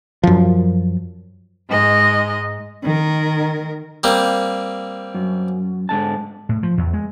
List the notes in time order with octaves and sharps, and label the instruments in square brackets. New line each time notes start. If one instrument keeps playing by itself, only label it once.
[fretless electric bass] F#2 F3
[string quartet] G#2 G#3 D#5
[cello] D#3 A#4
[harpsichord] G3 A#3 C4
[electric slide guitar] F#2
G#2 D3 A5
[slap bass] A2
F3
E2
G#3